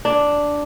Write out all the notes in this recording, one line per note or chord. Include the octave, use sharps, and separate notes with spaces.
D4